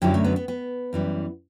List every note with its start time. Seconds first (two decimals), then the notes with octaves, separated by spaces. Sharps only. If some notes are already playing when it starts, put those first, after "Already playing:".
0.02 F#2 D3 F#3 E4 G4
0.14 A3
0.24 B3
0.36 B3
0.48 B3
0.93 F#2 E3 G3